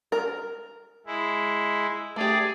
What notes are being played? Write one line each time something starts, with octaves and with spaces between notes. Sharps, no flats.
A#4
G#3 E4
A3 G4 G#4 D5